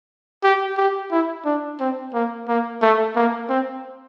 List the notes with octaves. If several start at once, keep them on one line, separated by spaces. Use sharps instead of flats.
G4
G4
E4
D4
C4
A#3
A#3
A3
A#3
C4